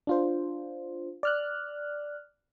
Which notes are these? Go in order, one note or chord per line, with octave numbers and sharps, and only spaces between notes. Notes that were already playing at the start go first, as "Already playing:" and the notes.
D4 F4 C5
D5 F6 F#6